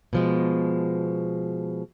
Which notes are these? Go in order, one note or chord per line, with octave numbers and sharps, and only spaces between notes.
B2 F3 G#3